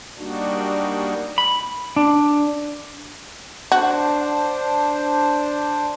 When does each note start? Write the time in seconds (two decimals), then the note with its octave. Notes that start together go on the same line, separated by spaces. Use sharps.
0.18 G3 A#3 D4 D#4 F#4
1.38 B5
1.96 D4
3.72 D4 F#4 C5